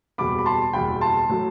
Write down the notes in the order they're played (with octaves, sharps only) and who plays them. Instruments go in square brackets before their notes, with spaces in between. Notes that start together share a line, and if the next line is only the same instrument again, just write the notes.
[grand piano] F#1 E2 B2 G3 B5 D6
B5
A5 C6
F#1 E2 B2 G3 G5 B5
A5 C6
A2 F#3 A3